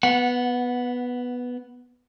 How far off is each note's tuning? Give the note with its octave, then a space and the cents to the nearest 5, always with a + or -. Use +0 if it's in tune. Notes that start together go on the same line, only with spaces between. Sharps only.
B3 +0 F#5 -15